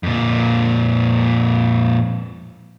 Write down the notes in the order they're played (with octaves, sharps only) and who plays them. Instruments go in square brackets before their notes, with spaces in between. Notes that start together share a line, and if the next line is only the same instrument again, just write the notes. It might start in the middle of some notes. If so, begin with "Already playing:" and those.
[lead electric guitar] F2 A#2